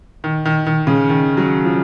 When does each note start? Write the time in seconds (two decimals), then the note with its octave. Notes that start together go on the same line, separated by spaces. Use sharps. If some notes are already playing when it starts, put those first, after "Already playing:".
0.24 D#3
0.45 D#3
0.67 D#3
0.87 C#3
1.09 D#3
1.37 F#3
1.65 F3